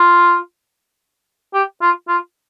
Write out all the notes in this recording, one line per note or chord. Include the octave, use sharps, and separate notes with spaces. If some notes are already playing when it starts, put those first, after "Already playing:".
Already playing: F4
G4
F4
F4